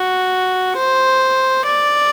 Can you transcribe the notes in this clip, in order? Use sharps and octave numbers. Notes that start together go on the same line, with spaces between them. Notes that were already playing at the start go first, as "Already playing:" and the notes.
Already playing: F#4
C5
D5